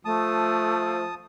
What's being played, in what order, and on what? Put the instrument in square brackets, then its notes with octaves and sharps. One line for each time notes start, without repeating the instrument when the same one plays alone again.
[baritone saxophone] F3 [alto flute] A3 [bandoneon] A5 D#6